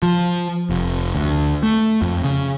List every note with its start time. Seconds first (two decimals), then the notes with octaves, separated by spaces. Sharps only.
0.03 F3
0.70 F1
1.15 D2
1.63 A3
2.02 F2
2.24 C#3